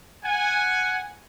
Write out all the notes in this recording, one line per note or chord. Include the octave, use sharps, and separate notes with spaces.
F#5 G#5